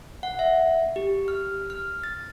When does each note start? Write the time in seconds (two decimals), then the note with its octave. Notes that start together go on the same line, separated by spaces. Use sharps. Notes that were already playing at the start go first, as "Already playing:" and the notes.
0.23 F#5
0.39 E5
0.96 G4
1.28 F6
1.70 F6
2.04 A6